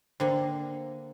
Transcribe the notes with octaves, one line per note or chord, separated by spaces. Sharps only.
D3 A#3 C5 G5